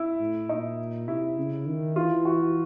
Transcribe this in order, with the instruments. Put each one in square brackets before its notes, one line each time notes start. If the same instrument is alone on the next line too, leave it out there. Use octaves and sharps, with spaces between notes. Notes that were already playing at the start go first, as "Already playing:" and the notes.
Already playing: [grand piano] E4
[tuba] A2
[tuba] A#2 [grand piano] D#4
[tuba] C3 [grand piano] E4
[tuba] C#3
D#3
[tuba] E3 [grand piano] F4
[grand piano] F#4